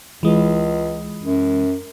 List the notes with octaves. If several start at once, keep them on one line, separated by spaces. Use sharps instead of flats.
C#2 E3 G#3
F#2